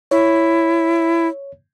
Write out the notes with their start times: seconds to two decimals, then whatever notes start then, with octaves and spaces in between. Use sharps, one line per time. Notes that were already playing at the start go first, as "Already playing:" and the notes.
0.11 E4 C#5